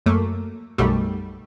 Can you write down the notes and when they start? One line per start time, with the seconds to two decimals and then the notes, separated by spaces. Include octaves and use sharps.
0.06 F#2 A3 A#3
0.78 B1 F#2 B2 G3 A3